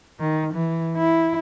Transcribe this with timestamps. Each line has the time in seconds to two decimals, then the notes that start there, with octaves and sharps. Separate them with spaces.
0.20 D#3
0.54 E3
0.97 E4